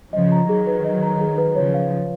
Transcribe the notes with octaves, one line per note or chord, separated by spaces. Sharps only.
C#3 F3 D#5
A#5
D#3 F#3 G#4
B4
D#5
A#5
G#4
B4
C#3 F3 C#5
F5
F4